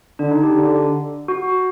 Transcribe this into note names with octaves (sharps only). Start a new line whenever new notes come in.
D3 D4
D#4
G4
D3
F#4